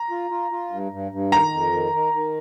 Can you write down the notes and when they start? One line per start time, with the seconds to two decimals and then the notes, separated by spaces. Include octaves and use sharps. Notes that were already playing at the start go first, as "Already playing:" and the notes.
Already playing: A#5
0.10 F4
0.30 F4
0.51 F4
0.70 G2
0.92 G2
1.11 G2
1.31 D#3 A#5
1.52 F2
1.73 D#3
1.93 D#3
2.13 D#3